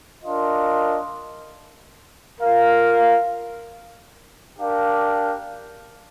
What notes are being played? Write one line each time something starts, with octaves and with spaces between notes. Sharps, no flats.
D4 F4 A#4 D#5
F4 A#4 F5
D4 G4 A#4 F5